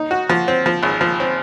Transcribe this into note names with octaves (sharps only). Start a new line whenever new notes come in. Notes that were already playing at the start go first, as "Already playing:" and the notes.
Already playing: D#4
F#4
F3
C4
F3
G#1
F3
C4